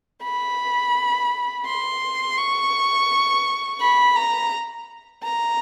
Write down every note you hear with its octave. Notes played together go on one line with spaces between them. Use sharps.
B5
C6
C#6
B5
A#5
A#5